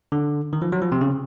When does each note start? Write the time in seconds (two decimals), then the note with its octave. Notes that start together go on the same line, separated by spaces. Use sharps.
0.12 D3
0.53 D#3
0.62 F3
0.72 F#3
0.82 F3
0.92 C3
1.01 C#3